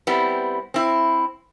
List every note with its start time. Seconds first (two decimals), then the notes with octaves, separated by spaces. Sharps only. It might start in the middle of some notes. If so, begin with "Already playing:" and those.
0.07 G3 B3 C4 E4
0.74 C4 E4